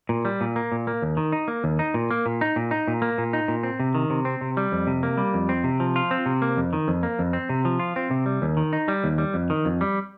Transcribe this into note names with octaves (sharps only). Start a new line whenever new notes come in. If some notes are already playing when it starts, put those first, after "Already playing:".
A#2
G3
A#2
A#3
A#2
A#3
D#2
D#3
D#4
A#3
D#2
D#4
A#2
A#3
A#2
D#4
A#2
D#4
A#2
A#3
A#2
D#4
A#2
C4
C3
D#3
C3
C4
C3
G3
F2
C3
A#3
G3
F2
C4
C3
F3
F4
C4
C3
A#3
F2
D#3
F2
A#3
F2
C4
C3
F3
F4
C4
C3
G3
D#2
D#3
D#4
G3
D#2
G3
F2
D#3
F2
G3